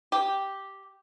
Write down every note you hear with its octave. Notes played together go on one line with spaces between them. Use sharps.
G4